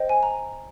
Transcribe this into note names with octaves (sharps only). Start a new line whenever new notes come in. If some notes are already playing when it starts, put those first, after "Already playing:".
Already playing: C5 D#5 G5
G#5
A#5